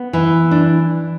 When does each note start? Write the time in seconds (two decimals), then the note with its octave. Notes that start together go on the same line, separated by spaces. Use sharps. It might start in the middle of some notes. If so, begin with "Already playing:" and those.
Already playing: B3
0.13 E3
0.51 D4